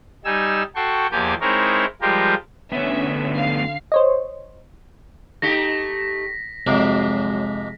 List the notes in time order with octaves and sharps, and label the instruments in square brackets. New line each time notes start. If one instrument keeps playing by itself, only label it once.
[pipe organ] G3 D#4 G#5 E6
F#4 A4 G5 C6 C#6
E2 F3 A#3 G4 G#5 D6
G#3 C4 D#4 E4 A#4 C#5
F3 G3 G#3 F4 G4 A#4
[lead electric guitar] D2 B3 [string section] D3 [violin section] C#4 E5
[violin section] F5 C7
[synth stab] C5 C#5 D#5
[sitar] A3 D#4 G4 [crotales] A#6 B6
[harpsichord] F2 G#2 C3 [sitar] F#3 [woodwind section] G#3